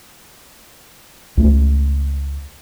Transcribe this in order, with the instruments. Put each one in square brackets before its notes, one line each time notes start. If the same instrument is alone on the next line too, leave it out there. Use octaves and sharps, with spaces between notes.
[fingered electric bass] C#2 A3